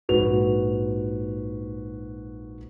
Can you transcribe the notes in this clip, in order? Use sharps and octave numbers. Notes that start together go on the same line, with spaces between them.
A#1 G#2 F#4 B4 F7